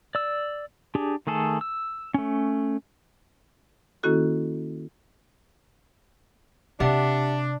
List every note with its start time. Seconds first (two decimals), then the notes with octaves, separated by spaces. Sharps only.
0.15 D5 E6
0.95 D4 G4 G#4
1.27 D#3 A3 G#4 A4
1.61 E6
2.14 A3 C#4
4.03 D#3 A#3 C#4 E4 F#4 A4
6.80 C3 D4 G4 E5 F#5